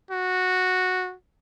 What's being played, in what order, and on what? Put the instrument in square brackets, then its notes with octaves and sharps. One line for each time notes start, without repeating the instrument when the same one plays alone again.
[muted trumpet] F#4